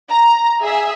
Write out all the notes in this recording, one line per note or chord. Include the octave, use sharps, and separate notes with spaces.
A#5
G#4 E5